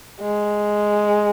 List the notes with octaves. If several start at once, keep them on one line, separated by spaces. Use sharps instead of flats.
G#3